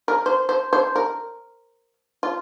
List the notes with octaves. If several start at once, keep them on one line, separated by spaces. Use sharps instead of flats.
A#4
C5
C5
C5
A#4
F4